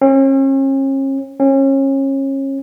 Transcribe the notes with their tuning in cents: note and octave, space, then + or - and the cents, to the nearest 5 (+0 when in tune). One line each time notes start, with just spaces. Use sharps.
C#4 -40
C#4 -30